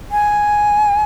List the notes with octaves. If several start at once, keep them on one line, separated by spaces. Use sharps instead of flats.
G#5